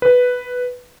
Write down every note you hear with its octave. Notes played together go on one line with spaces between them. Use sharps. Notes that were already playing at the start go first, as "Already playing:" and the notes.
B4